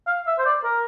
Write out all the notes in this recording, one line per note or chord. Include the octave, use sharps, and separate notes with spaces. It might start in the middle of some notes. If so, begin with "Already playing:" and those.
F5
E5
C5
D5
A#4